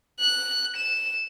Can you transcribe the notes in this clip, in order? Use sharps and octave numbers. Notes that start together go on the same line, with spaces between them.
F#6
E7